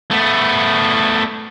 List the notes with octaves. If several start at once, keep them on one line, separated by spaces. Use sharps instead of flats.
A3 B3